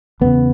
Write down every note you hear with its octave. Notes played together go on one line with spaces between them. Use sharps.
E2 C#3 B3